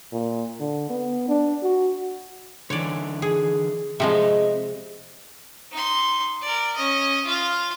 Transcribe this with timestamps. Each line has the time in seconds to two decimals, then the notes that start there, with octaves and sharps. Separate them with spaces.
0.12 A#2
0.60 D3
0.90 B3
1.28 D4
1.63 F#4
2.70 D3 E3 C#5 D5
3.22 G#4
4.00 C3 F3 G#3 C4 D#5 E5
5.72 D#4 C6
6.42 A#4 D5
6.76 C#4 D#5
7.25 F4 F5